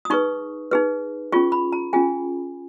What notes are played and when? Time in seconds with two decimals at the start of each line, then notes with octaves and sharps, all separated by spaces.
0.05 D#6
0.10 D#4 G#4 B4 C#6
0.71 D#4 G#4 B4
1.32 C#4 F4 G#4 C#6
1.52 B5
1.73 A#5
1.93 C#4 F4 G#4 G#5